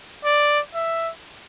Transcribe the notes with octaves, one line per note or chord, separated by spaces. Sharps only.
D5
E5